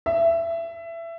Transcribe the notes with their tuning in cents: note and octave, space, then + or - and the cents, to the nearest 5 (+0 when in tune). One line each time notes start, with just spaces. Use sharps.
E5 +20